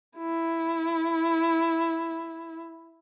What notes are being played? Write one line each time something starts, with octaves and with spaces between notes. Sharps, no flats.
E4